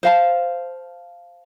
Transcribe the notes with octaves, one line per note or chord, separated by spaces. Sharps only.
C5 F5 A5